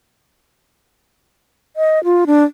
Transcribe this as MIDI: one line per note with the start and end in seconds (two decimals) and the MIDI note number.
1.76 2.03 75
2.04 2.25 65
2.27 2.44 62